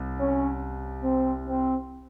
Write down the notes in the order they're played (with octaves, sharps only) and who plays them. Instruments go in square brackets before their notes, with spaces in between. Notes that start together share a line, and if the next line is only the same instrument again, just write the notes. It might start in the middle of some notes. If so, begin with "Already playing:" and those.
Already playing: [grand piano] C2
[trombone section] C#4
C4
C4